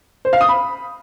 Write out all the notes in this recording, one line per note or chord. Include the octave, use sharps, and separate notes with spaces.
C5
F5
D#6
B5